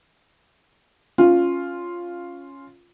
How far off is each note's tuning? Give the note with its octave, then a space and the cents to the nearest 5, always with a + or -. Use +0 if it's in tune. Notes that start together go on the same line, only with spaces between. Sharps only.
C#4 +0 F4 +0